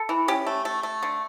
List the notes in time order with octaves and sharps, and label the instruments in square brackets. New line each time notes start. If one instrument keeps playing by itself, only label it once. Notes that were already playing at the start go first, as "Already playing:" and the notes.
Already playing: [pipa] A4
E3
C#4 G4
A3
A3
A3
D3